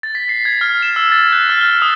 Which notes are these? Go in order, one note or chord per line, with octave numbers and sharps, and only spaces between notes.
A6
B6
C7
G#6
F6
E7
E6
A6
F#6
F6
G7
D#6